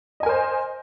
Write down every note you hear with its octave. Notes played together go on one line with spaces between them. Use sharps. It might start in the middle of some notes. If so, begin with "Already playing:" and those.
A#4 C5 D#5 G#5